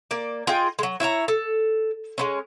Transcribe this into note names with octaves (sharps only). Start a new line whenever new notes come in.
A#3 D5
F4 G#4 D#5 G5
F#3 G#3
E4 C#5 E5 A#5
A4
G#3 B3 C#4